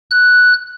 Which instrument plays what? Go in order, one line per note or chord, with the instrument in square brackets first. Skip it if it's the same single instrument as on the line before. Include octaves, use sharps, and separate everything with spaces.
[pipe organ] F#6